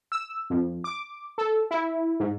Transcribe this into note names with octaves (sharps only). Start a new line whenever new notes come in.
E6
F2
D6
A4
E4
G#2